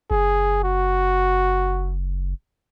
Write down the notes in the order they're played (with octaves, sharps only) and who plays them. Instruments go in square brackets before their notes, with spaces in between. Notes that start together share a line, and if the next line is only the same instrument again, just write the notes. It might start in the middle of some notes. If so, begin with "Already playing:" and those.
[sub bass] F#1 [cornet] G#4
[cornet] F#4